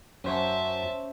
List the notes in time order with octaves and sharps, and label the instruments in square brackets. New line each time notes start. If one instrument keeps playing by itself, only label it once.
[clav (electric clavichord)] F#2 [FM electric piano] C#4 C5 C#5 [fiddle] E5 A5